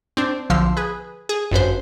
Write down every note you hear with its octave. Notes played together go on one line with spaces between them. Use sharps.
C4 D4
B1 D3 F3 F5 C6 E6
G#4 B4
G#4
G1 F#2 B4 C5